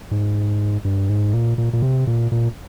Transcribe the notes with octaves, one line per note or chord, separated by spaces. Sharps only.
G#2
G2
G#2
A#2
A#2
A#2
C3
A#2
A#2